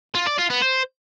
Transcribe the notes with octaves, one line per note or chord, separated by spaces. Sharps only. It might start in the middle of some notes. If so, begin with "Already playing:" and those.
F4
D5
F4
B3
C5